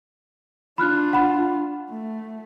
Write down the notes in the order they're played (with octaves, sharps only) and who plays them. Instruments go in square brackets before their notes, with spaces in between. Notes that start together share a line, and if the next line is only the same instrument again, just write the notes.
[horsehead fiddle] D4 F4 [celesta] B5 F6 F#6
[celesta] F#5 B5
[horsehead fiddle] A3